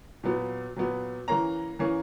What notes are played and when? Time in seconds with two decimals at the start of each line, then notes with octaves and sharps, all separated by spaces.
0.23 A#2 F#3 B3
0.76 A#2 F#3 B3
1.28 E3 A#3 C#4 A#5
1.79 E3 A#3 C#4